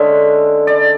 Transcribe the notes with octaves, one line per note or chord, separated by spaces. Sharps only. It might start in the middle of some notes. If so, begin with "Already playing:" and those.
Already playing: D3 G#3 C#4 E5
D5